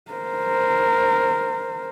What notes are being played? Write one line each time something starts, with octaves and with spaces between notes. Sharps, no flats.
A#4 C5